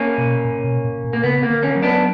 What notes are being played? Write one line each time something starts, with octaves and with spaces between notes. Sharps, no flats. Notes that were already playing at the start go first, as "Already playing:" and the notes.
Already playing: A#3 C#4
B2
A#2
B2
A#2
A#2
A#3
C#3 B3
A#3
D3
A#3 C#4
F#3
B3 D4